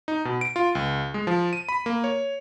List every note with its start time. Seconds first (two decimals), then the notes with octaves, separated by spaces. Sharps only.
0.08 D#4
0.25 B2
0.41 D7
0.56 F4
0.75 C#2
1.14 G#3
1.27 F3
1.53 D#7
1.69 B5
1.86 A#3
2.04 C#5